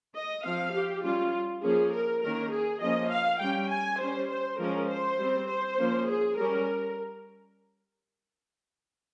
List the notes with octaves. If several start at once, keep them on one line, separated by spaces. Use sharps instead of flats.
D#5
F3 C4 F5
G4
G3 C#4 F4
F3 A#3 C#4 G#4
A#4
D#3 A#3 C#4 A#4
G#4
F3 A#3 C#4 D#5
F5
G3 C#4 G5
G#5
G3 C#4 C5
C5
F3 G#3 C#4 A#4
C5
G3 C4
C5
F3 A#3 C#4
G#4
G3 C#4 A#4